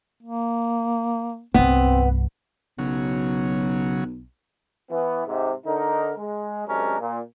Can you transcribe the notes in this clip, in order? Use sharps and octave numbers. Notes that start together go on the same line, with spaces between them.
A#3
C2 G2 B3 C4
B1 C#3 F#3
E3 B3
G#2 C3
D3 D#4 A#4
G#3
F#2 C3 G#3 C#4 D4 A#4
A#2